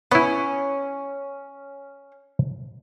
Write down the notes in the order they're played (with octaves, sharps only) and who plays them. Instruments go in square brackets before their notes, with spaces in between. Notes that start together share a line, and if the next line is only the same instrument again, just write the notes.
[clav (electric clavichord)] B3 E4 [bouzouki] C#4